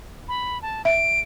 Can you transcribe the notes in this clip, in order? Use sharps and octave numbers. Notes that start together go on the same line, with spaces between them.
B5
A5
E5 D7